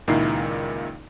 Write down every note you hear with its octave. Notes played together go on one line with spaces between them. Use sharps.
C#2 A#2 D#3 D#4 E4 C7